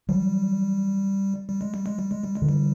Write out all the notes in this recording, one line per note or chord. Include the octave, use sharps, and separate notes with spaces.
E3 F#3 G3
G3
G#3
G3
G#3
G3
G#3
G3
G#3
D3 E3
G3